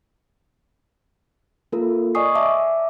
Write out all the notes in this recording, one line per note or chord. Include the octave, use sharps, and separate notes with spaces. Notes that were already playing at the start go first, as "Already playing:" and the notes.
A#3 F4 A4 A#4
D5 D#5 G#5 C#6 D#6 C7
D5 E5 A5 D6